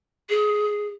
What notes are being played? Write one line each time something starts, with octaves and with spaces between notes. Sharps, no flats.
G#4